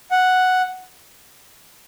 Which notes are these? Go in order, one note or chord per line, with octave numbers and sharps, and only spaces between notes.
F#5